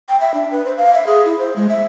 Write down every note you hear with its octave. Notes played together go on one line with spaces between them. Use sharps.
G5
E5
D4
B4
C5
F5
E5
G#4
E4
C5
G#3
E5